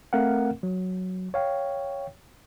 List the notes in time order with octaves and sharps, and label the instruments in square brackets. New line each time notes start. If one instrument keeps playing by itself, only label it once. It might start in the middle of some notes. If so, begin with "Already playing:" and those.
[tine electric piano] A3 C4 A#4 F5 F#5
F#3
C#5 F5 G5